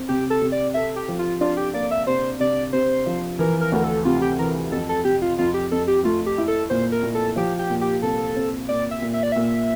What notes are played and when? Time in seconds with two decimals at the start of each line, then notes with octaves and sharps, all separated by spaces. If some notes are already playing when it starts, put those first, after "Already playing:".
Already playing: C4
0.09 C3 G4
0.30 A4
0.42 C3
0.52 D5
0.74 A4 E5
0.96 G4
1.08 F3
1.19 F4
1.41 D4 F4
1.57 G4
1.73 A#3 D5
1.91 E5
2.07 C3 C5
2.40 C3 D5
2.73 C3 C5
3.06 F3
3.39 E3 A#4
3.61 A#4
3.72 D2 A#4
3.84 A4
4.05 C3 F4
4.22 G4
4.39 E3 A#4
4.72 F2 A4
4.89 A4
5.04 C3 G4
5.22 F4
5.38 F2 F4
5.54 G4
5.71 F2 A4
5.88 G4
6.04 A3 F4
6.26 G4
6.38 E4
6.48 A4
6.70 A#2 C5
6.92 A#4
7.03 A#2
7.15 A4
7.36 F3 G4
7.59 G4
7.70 A#2
7.81 G4
8.02 C2 A4
8.36 C4
8.69 A#2 D5
8.91 E5
9.02 A#2
9.14 E5
9.23 D5
9.32 A#2 E5